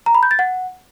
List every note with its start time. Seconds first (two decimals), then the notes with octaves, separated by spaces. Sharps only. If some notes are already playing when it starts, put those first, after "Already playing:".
0.06 A#5
0.15 B5
0.23 G6
0.31 A6
0.39 F#5